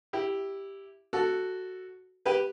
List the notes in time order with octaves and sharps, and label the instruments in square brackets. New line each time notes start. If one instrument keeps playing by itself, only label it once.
[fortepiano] E4 G4
F#4 A4
G4 B4